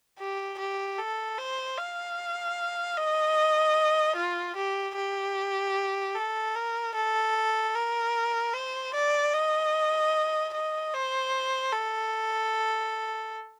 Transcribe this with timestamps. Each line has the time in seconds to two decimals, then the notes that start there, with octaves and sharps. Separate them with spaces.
0.19 G4
0.59 G4
0.98 A4
1.38 C5
1.77 F5
2.97 D#5
4.16 F4
4.56 G4
4.96 G4
6.15 A4
6.55 A#4
6.94 A4
7.75 A#4
8.54 C5
8.94 D5
9.33 D#5
10.53 D#5
10.93 C5
11.73 A4